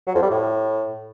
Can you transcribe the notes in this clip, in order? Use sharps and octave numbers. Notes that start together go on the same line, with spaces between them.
F#3
F2
G3
A2